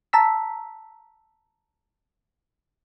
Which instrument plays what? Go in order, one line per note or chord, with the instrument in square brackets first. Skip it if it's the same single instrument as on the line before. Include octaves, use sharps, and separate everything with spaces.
[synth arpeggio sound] A5 A#5 E6 B6